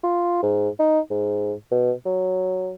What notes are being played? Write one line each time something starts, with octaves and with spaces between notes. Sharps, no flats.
F4
G#2
D#4
G#2
B2
F#3